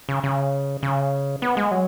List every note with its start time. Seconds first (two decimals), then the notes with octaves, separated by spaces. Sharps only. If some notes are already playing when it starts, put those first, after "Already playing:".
0.09 C#3
0.24 C#3
0.83 C#3
1.42 B3
1.57 G#3
1.71 F#3